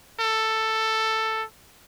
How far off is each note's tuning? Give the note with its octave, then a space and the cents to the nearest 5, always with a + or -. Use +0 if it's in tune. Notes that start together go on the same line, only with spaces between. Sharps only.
A4 +10